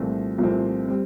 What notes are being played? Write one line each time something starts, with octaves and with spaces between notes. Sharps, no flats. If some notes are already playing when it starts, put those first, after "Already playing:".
Already playing: C2 A#2 F3 A3 C4
C2 A#2 F3 A3 C4
G3 C4